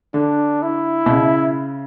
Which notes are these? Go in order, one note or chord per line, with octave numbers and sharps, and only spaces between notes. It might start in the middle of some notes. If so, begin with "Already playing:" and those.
D3 D4
E4
B2
C#3